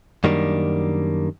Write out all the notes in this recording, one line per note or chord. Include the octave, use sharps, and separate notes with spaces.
F#2 D#3 G3 A#3 D4